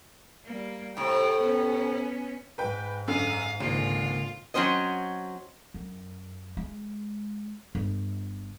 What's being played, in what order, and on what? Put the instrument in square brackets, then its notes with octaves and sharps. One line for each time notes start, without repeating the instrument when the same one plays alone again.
[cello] G3 A#3
[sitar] A2 C3 [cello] G5
[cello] B3 C#4
[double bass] G#2 [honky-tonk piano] B4 G5
[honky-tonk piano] F#2 D3 [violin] F5 D#6
[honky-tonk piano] G#1 [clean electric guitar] C#2 A#3 [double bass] G#2 D3 [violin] F4
[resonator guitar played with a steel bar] F#3 C4 C#4 C5 D#5
[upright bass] F#2
G#3
G1